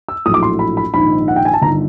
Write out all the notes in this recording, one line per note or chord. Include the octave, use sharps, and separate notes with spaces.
E6
A#1 A2 F#3 D#6
D6
C6
B5
B5
A#1 G#2 D#3 B5
F#5
G5
G#5
A5
G1 G2 D#3 A#5